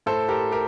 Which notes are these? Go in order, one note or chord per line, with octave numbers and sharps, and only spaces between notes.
A2 A4 C5
G4 A#4
G4 A#4